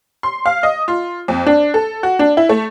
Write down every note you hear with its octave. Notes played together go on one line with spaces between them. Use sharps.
C6
F5
D#5
F4
F2
D4
A4
F#4
D4
E4
A3